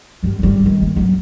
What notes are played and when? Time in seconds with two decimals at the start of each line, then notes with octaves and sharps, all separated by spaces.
0.23 F#2 G3
0.39 G#1 G3
0.62 D2 D#3
0.81 A#3
0.96 F#3